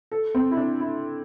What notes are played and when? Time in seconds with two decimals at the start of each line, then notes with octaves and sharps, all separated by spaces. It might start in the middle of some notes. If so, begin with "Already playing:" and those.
0.12 A4
0.35 C4
0.51 E4
0.57 D4
0.80 E4